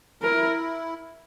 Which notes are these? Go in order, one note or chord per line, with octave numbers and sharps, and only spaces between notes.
E4 A#4